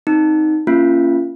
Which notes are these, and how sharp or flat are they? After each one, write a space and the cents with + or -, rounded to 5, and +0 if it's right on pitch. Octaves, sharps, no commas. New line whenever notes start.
C4 +0 D#4 +0
A#3 +0 C#4 +0 F4 -25